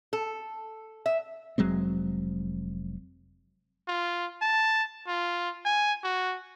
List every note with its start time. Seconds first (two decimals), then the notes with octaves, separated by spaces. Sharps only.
0.13 A4
1.06 E5
1.58 F1 F#3 G#3 C4
3.88 F4
4.42 A5
5.07 F4
5.65 G#5
6.04 F#4